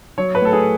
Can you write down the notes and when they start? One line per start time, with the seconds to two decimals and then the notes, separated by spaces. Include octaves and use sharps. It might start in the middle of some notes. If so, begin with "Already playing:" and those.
0.18 F#3 C#5
0.35 B4
0.41 A2 A4
0.53 G#4